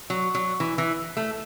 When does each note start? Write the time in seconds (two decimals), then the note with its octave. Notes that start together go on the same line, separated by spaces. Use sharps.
0.10 F#3
0.35 F#3
0.60 E3
0.78 E3
1.17 A3